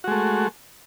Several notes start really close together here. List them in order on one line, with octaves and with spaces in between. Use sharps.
F#4 G#3 A3